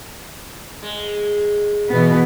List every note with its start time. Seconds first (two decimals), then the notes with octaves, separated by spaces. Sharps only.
0.83 G#3
1.89 B2 E3 B3